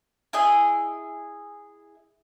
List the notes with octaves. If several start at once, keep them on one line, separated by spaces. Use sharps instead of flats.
E4 G#4 D#5 G#5